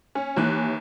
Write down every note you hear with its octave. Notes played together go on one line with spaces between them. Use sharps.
C#4
D#2 E3 F#6